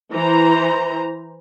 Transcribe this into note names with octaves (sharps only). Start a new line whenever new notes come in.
E3 C5 A#5